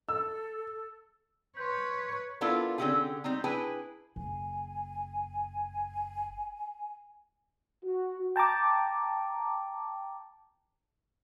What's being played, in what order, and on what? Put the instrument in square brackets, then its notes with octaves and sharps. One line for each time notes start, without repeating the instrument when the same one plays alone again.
[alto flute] A4 [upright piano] E6
[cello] B4 C#5 [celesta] C6 G6
[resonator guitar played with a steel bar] B3 D4 E4 F4 A4 A#4
D3 C4 C#4 E4 G4 G#4
G3 C4 D#4
D4 E4 G#4 B4 G5 G#5
[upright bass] F#1 [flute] G#5
[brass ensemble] F#4
[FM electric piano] G5 A5 A#5 D6